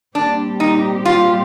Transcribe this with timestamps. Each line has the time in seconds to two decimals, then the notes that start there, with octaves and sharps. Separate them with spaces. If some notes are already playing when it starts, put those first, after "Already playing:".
0.15 A#2 G3 C4 D4 G4
0.60 D#4
1.05 F4